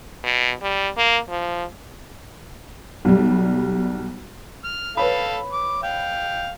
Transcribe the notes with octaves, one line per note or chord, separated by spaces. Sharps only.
B2
G3
A#3
F3
B1 G3
F6
A4 B4 C#5 F5 B5
D6
F5 G5